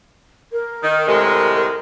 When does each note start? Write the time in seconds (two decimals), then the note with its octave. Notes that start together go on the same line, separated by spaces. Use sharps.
0.52 A#4
0.82 D#3
1.08 A2 C3 G#3 A#4